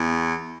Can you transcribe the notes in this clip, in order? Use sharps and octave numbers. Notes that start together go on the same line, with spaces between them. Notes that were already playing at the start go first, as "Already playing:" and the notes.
Already playing: E2